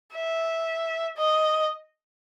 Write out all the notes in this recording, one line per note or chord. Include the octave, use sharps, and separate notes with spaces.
E5
D#5